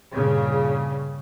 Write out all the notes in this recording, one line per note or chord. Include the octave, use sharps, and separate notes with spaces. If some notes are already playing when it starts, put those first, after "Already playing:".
G2 A#2 C#3